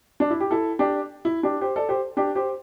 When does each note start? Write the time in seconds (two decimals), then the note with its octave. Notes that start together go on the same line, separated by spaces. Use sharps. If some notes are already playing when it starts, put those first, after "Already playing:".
0.20 D4
0.30 E4
0.40 G4
0.51 E4 A4
0.79 D4 G4
1.25 E4
1.43 D4 G4
1.61 G4 C5
1.76 A4 D5
1.89 G4 C5
2.17 D4 G4
2.35 G4 C5